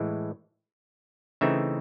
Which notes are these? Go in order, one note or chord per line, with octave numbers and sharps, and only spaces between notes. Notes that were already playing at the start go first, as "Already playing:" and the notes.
Already playing: A2 E3 G#3
C#3 E3 A3 C4 D#4 E5